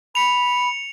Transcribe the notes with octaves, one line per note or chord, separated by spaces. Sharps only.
B5 C#7 F7